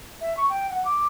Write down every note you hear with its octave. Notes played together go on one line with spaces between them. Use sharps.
E5
C#6
G5
F#5
D6